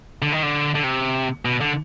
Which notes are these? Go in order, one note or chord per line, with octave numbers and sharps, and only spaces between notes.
D3
D#3
D3
D3
C3
B2
D3